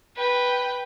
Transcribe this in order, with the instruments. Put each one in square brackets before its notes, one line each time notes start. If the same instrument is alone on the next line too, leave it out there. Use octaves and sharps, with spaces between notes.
[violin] B4 G5